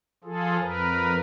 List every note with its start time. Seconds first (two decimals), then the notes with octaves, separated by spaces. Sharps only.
0.24 F3 F4 G#4 A4
0.61 F2 A#4 B4